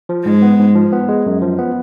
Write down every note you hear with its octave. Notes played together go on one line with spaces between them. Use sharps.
F3
G#2 G#3
B3
G#2
F3
B3
G#3
F#2
F3
B3